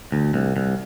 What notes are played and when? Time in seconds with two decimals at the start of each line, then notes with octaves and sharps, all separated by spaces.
0.12 D2
0.34 C2
0.57 C2